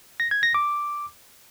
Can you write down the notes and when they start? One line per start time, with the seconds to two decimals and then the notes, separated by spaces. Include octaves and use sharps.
0.20 A#6
0.31 G#6
0.43 A#6
0.55 D6